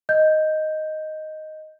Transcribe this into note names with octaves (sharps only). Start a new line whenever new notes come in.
D#5 G6